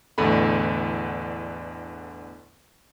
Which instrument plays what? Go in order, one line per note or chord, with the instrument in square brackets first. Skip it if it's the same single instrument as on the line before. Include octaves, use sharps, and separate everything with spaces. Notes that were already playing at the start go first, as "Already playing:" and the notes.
[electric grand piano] A1 E2 D3 A3 B5